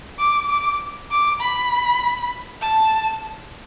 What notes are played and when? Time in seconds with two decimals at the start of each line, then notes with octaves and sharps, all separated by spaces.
0.19 D6
0.49 D6
1.11 D6
1.41 B5
2.62 A5